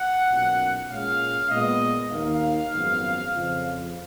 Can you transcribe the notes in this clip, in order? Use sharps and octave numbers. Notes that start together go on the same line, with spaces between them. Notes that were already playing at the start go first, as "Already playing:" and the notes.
Already playing: F#5
B1 A#2 F#3 C#4
A#2 G#3 C#4 F5
A#2 G#3 B3 D#5
D#2 D#3 A#3 D#4 F5
G#1 F#2 F3 G#3 B3
F2 C#3 F3